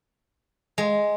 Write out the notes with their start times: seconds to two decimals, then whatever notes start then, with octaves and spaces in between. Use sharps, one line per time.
0.78 G#3